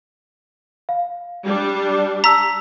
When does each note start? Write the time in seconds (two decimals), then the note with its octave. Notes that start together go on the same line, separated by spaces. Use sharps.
0.89 F5
1.44 G3 D4
2.24 A5 A#5 E6 B6